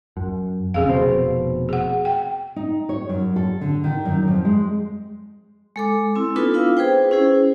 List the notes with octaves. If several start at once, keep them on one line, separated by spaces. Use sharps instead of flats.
F#2
F2 C#3 G#4 F5
F1 B2 C4
G#4 F#5
G5
D#4
C#5
F#2
A4
D3
D#3
F#2
F2
G#3
G#3 A4 D6
C4 E4
B3 D4 D#4 F4 A4 B4
D4 E4 F4 F5
G#4 B4 C5 G5
C#4 E4 G#4 C5